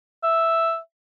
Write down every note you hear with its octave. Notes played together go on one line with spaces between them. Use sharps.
E5